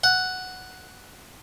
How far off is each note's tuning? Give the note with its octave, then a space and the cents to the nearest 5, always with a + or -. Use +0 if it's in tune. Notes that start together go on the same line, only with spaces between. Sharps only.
F#5 +0